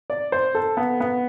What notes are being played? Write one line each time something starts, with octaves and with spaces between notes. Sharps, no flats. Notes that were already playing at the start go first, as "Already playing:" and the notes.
D5
C5
A4
B3
B3